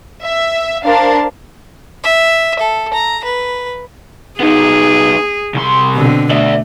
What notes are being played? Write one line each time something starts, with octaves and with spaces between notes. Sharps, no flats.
E5
D4 A#4 C5 F5 A5
E5
A4
A#5
B4
B3 D#4 G#4
C2 C6
B2 D3 C4
A3 D5 E5